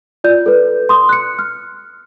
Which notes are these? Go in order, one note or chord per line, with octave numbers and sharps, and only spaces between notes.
F4 D5 G6
A4 B4
C6 D#6
F#6 C#7
F6